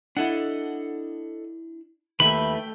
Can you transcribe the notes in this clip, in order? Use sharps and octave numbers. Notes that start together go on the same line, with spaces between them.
D4 E4 A4 D#5 F#5
D#2 D#3 A3 B4 E5 G5 B5